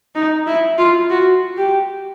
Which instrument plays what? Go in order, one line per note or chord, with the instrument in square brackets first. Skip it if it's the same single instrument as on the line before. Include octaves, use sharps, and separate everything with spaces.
[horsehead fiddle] D#4
E4
F4
F#4
G4